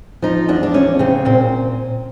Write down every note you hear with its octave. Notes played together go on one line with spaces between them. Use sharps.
F3 D#4
E2 D4
D4
E2 C#4
C#3 C4
A#2 C4